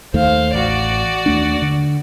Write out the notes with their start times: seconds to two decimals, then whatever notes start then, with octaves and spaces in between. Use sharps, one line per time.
0.14 D#2 D#3 A3 C5 F5
0.54 A1 F#4 D5
1.26 D#2 A3 D4
1.62 D3